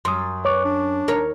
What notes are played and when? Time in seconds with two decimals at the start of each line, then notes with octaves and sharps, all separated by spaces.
0.05 F#2 C6 D#6
0.45 B4 C#5 C#6 D6
0.64 D4
1.08 D#2 A#4 C#5